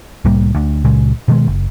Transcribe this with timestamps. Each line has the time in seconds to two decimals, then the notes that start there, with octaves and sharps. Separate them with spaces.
0.25 C2 A2 G3 A#3
0.55 D2
0.85 C#2 A#2 C#3 G#3
1.28 B2 D#3 G3 G#3
1.47 F#1